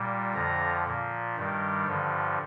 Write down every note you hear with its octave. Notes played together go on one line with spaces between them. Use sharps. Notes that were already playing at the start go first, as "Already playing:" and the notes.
Already playing: A#2 G3
F2 D3 F3 A#5
A#2 F3
G2 D#3 G3
G2 D3 F3